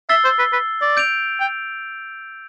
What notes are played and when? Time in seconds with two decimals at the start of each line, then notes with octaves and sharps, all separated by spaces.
0.09 E5 E6 A6 C7 G7
0.25 C5
0.39 B4
0.53 B4
0.82 D5
0.97 G6 D7 F7
1.40 G5